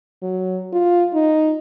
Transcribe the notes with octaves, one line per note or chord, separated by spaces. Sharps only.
F#3
F4
D#4